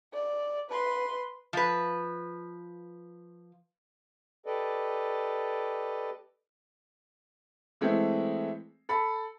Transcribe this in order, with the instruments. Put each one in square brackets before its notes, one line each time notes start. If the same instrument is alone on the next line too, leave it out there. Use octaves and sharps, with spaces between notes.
[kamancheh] D5
B4 C6
[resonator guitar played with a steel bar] F3 B4
[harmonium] G4 A4 B4 D5 D#5
[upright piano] E3 G#3 A3 C4
A4 B5